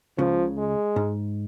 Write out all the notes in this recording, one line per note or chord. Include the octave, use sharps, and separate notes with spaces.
C#2 C#3 F3
G#3
G#2